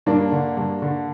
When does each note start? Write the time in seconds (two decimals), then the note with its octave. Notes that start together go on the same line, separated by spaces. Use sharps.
0.06 G2 A#3 D4
0.32 D3
0.57 G2
0.82 D3